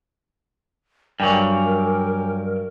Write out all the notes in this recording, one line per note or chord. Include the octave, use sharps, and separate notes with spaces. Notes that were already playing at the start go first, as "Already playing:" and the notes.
G2 F#3 A#4 G5 G#5 D6